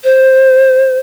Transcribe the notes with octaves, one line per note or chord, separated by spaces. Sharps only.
C5